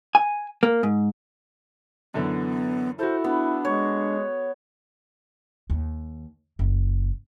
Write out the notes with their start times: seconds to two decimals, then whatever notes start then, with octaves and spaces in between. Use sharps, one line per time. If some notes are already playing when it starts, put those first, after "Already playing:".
0.15 G#5
0.63 A#3
0.83 G#2
2.14 F#2 D3 E3 B3
2.99 E4 F#4 A4 C5
3.24 B3 D4
3.65 G#3 C#5
5.70 D#2
6.59 F#1